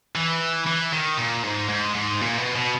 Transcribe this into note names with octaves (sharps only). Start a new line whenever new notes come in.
E3
E3
D#3
A#2
G#2
G#2
G#2
A#2
B2
B2